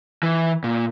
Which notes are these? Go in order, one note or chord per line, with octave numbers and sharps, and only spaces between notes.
E3
A#2